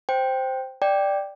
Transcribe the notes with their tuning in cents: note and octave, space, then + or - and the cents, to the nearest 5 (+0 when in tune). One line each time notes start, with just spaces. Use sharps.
C5 +0 G5 +0
D5 +0 G5 +0